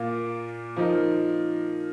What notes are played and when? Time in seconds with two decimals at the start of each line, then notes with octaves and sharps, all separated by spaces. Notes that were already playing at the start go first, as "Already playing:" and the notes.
Already playing: A#2 A#3 F4
0.76 F3 D#4 A#4